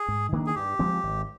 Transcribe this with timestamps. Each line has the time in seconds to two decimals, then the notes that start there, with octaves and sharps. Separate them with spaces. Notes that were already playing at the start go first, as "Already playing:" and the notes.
Already playing: G#4
0.08 G#2
0.32 D#3 A#3 D4
0.47 G#4
0.55 G2 G4
0.79 F3 G#3 C4
1.03 G#1